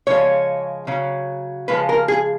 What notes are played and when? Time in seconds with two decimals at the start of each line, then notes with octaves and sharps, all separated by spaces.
0.07 C#3 F3 G#3 C#5
0.87 C#3 F#3
1.68 C#3 F3 G#3 B4
1.89 A#4
2.08 G#4